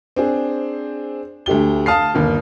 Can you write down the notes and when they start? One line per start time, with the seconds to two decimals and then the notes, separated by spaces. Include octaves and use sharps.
0.16 C4 D4 G#4
1.46 D2 A3 G4 G7
1.86 F5 A5 D#6 F6 C7
2.15 G1 D#2